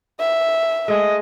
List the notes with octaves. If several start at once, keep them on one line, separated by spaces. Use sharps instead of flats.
E5
G#3 A3 D#5